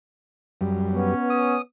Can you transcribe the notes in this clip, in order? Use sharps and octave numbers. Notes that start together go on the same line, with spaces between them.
F#2 G3
B3 C#4
D#6